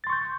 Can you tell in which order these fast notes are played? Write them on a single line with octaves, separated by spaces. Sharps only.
A6 C6 C#6 G6